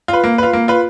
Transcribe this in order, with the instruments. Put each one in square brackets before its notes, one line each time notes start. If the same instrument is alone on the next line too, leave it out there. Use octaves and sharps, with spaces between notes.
[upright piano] F4
B4
A#3
F4 B4
A#3
F4 B4